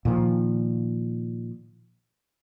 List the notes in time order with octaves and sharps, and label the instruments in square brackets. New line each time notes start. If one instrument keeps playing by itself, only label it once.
[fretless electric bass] A#2 D#3 F3